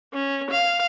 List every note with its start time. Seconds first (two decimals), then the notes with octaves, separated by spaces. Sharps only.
0.14 C#4
0.51 F5